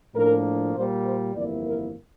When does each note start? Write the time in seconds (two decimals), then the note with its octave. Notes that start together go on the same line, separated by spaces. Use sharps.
0.15 A2 F3 A#3 D4 A#4
0.74 A#2 G3 A#3 C5
1.04 C5
1.35 G1 F2 E3 A#3 E4 D5
1.65 A#4